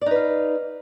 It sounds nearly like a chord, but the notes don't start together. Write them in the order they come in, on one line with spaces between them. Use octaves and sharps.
D5 D#4 B4 F5